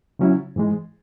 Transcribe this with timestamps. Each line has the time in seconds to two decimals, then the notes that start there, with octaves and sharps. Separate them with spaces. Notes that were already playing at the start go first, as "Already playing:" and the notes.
0.19 C#3 F#3 C#4 E4
0.56 G#2 E3 G#3